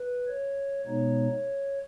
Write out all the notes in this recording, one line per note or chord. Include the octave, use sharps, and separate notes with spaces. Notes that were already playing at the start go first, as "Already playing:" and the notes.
Already playing: B4
C#5
B2 G#3 B3 D#4 C#5